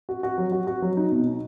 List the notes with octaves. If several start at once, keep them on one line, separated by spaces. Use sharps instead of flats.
F#4
F#4
F#3
F#4
F#4
F#3
D#4
B2
D#4